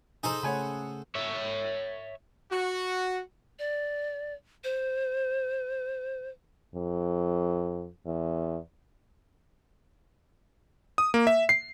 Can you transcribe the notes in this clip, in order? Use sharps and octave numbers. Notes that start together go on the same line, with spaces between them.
D#4 G#4 A4 C5 A#5
C#3 A3 C#5 F#5 G#5 B5
C#5 E5
F#4
D5
C5
F2
E2
D#6
A#3
E5
C7